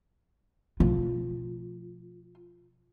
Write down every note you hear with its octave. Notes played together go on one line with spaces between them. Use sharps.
B2 F3 A3 F4